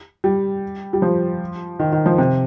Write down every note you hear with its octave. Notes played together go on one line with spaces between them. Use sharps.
G3
G3
F3
D#3
D#3
F3
C3